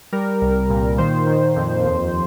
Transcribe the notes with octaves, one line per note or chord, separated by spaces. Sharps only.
G3 A#4
C2
A#2
D#3 C5
D#3
F2
D#2